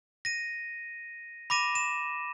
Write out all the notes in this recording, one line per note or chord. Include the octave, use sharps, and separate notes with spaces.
A#6 D#7
B5 D6 A#6 D#7 E7
E7